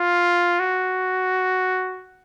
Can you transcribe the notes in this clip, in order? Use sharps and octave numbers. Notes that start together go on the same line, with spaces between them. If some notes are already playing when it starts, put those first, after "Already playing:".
Already playing: F4
F#4